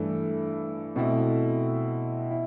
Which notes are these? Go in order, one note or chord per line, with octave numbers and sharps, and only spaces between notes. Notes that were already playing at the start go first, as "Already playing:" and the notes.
Already playing: G2 E3 A3
B2 A3 C4 E4
E4